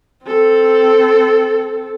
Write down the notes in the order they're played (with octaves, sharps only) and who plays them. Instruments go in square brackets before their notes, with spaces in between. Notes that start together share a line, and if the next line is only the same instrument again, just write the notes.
[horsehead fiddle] C4 A4